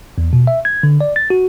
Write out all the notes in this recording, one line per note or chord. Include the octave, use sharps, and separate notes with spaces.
E2
B2
E5
G#6
D3
D5
A6
F#4